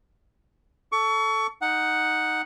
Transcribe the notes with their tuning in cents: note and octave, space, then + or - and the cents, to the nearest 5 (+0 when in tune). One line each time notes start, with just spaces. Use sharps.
A4 +0 C#6 +25
D#4 +0 F#5 +0